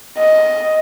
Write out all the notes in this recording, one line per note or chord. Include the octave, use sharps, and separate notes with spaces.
D#5